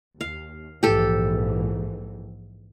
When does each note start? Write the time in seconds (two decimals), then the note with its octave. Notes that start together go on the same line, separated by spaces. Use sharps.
0.21 D#2 F5
0.83 A#1 G#2 E3 G4 A4